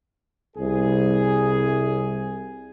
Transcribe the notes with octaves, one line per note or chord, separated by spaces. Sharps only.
C2 G#4